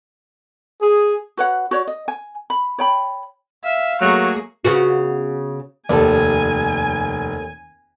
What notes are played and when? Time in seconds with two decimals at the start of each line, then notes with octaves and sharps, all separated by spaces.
0.82 G#4
1.37 F#4 B4 C#5 F#5
1.71 F#4 C#5 D5
1.87 D#5
2.08 G#5
2.50 B5
2.78 C#5 G5 B5
3.65 E5 F5
4.01 F#3 A3 A#3 G#4 C#6
4.65 C#3 B3 F#4
5.89 F1 D#2 A4 D5 G#5